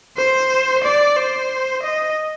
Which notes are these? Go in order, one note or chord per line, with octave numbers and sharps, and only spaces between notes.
C5
D5
C5
D#5